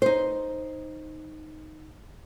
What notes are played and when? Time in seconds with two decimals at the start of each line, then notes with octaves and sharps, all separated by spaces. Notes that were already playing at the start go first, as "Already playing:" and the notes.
0.02 D#4 C5